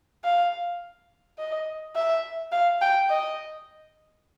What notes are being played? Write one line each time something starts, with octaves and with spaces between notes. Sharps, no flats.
F5
D#5
E5
F5
G5
D#5